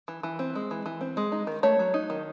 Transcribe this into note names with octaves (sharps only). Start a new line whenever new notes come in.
E3
E3
C4
G#3
E3
E3
C4
G#3
D#4
D#3
A3 C#5
F#3
D#4
D#3